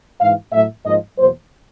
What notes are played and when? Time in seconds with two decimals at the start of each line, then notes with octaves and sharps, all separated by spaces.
0.21 G#2 E3 G#3 F5
0.52 A2 F#3 A3 E5
0.85 G#2 F3 A#3 D#5
1.17 E2 B2 F#3 A#3 C5